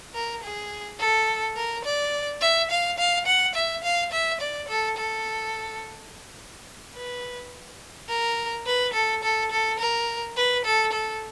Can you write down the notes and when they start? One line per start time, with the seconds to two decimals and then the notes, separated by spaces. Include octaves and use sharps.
0.14 A#4
0.43 G#4
1.00 A4
1.57 A#4
1.84 D5
2.41 E5
2.70 F5
2.98 F5
3.26 F#5
3.55 E5
3.83 F5
4.12 E5
4.40 D5
4.68 A4
4.97 A4
6.95 B4
8.09 A#4
8.66 B4
8.94 A4
9.23 A4
9.52 A4
9.79 A#4
10.37 B4
10.65 A4
10.92 A4